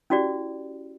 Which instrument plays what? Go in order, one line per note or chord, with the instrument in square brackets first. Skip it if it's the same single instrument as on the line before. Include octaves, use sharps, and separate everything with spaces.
[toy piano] C#4 E4 F#4 G4 D5